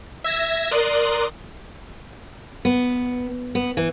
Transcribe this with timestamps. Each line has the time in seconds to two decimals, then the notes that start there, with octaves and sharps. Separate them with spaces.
0.24 E5 E6 G#6 A#6
0.71 A#4 D5 C6 D#6 F#6
2.65 B3
3.55 B3
3.77 E3